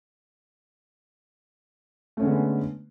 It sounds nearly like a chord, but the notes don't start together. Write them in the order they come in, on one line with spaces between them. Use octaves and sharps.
A3 C#4 D3 G#3 B3